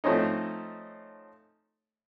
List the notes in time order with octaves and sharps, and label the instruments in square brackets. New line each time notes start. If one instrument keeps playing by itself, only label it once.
[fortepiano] F3 A3 C4 C#4 D#4